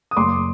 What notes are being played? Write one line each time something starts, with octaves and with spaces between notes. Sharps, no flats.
D#6
F#1 C6 D6